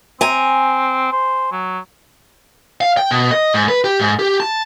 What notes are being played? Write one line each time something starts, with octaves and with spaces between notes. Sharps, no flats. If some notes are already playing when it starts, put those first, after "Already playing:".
C4 G#5 A#5
C5
F#3
F5
G5
B2
D#5
G#2
B4
G4
G#2
G4
A5